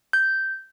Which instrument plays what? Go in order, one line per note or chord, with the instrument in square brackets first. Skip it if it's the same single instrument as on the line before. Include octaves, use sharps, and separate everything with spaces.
[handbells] G6